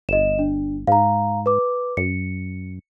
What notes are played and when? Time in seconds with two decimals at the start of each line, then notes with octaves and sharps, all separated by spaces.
0.09 G1 D#5 E7
0.39 D4
0.87 G#2 F5 A#5
1.46 B4 D6
1.97 F#2 C#7